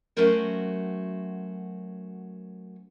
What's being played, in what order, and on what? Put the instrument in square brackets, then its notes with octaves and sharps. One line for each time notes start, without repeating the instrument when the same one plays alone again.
[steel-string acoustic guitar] F#3 A3 C#4 F#4 A#4 C5